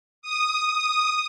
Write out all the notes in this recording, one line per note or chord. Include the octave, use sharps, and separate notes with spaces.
D#6
D#6